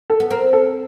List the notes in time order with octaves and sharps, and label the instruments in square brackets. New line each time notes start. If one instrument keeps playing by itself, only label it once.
[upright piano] A4
[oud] B3
[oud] C4 [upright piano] A#4
[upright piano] A4